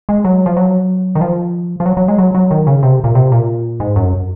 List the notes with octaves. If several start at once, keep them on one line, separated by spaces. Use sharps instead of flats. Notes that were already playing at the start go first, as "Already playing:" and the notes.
G#3
F#3
F3
F#3
D#3
F3
F3
F#3
F#3
G#3
F#3
F#3
D#3
C#3
C3
A#2
C3
A#2
G#2
F#2